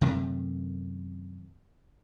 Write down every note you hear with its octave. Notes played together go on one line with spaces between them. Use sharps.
F#2 C3 D#3 A3